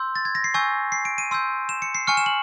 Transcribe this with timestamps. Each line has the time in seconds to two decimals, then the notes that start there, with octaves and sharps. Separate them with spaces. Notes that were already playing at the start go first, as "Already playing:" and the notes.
Already playing: C6 E6 G6
0.16 A6
0.25 G#6
0.35 A#6
0.44 C7
0.54 G#5 C#6 E6 G6
0.92 C7
1.05 D7
1.18 D#7
1.31 C6 E6 G6
1.69 E7
1.82 C#7
1.95 C7
2.07 G#5 C#6 F6 C#7
2.17 E7
2.26 F#7